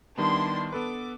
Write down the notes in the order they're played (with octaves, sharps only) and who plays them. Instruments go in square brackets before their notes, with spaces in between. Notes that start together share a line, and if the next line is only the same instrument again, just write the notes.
[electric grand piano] D#3 G3 B3 [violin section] D4 E4 C6
[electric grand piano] B3 A4 B4 [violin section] D6